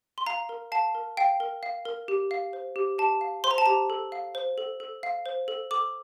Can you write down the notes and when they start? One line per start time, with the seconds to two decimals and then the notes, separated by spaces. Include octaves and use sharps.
0.18 C6
0.26 F5 A#5
0.49 A#4
0.72 F5 A5
0.95 A#4
1.17 F5 G5
1.40 A#4
1.63 F5
1.85 A#4
2.08 G4
2.31 F5
2.53 C5
2.76 G4
2.99 G4 A5
3.21 F5
3.44 C5 C6
3.51 A#5
3.58 A5
3.66 G4 A#5
3.90 A4
4.12 F5
4.35 C5
4.58 A4
4.80 A4
5.03 F5
5.26 C5
5.48 A4
5.71 A4 D6